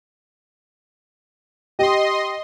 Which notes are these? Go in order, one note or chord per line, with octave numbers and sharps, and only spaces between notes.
G4 D#5 C6